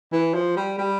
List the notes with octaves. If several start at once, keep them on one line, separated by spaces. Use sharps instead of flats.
E3
F3
G3
G3